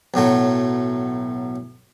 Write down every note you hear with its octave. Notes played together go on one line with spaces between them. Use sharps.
B1 A2 F#3 A3